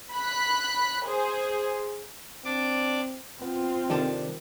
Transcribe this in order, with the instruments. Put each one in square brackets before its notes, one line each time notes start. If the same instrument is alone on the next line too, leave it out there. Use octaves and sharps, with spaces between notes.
[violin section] B5 F#6
G#4 C5
[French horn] C4 [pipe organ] D4 D5 D6
[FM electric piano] B3 [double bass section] C4 [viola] F4
[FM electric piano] C3 D#3 [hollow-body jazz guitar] G3 D4 A4